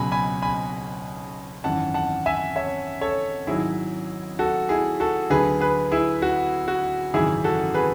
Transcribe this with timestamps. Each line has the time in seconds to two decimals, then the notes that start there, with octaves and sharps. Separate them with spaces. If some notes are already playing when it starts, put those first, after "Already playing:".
Already playing: C#2 B2 F#3 G#5 B5
0.12 G#5 B5
0.42 G#5 B5
1.64 G#1 F#2 E3 F#5 A5
1.94 F#5 A5
2.26 E5 G#5
2.56 C#5 E5
3.01 A4 C#5
3.47 G#1 G#2 F#3 E4 G#4
4.39 F#4 A4
4.69 E4 G#4
5.00 F#4 A4
5.30 D2 D3 F#3 G#4 B4
5.61 G#4 B4
5.91 E4 G#4
6.22 F#4
6.68 F#4
7.14 G#1 F#2 C#3 E3 E4 G#4
7.44 F#4 A4
7.74 G#4 B4